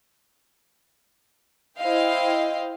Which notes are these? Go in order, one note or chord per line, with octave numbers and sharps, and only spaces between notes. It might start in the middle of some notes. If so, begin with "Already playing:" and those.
E4 C5 D#5 F5 G5